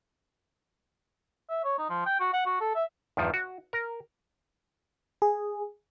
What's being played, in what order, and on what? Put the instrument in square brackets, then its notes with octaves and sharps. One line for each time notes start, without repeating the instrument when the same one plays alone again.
[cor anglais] E5
C#5
D#4
F3
G5
F#4
F#5
F#4
A4
E5
[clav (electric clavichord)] E2 G2 D#3 F3
F#4
A#4
[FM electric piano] G#4